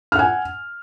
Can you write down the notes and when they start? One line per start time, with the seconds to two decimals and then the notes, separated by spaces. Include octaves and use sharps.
0.12 F6
0.16 F#5
0.19 G#5